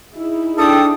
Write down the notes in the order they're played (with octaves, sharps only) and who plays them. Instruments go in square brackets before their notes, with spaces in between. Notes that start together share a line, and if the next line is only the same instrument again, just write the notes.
[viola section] D#4 E4 G#4
[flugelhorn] D4 [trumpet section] A4 G5 [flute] D#6